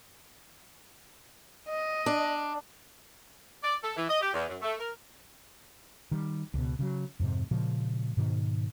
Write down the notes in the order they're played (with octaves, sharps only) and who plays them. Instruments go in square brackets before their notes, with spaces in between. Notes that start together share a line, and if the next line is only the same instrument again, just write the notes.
[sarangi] D#5
[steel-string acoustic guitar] D4
[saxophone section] D5
A4
E3
D#5
G4
E2
F#2
A3
A#4
[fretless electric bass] D#3 G3
C#2 B2
C#3 E3 F#3
F2 G#2 C3
A#2 C#3 F3 G#3
G#2 B2 D#3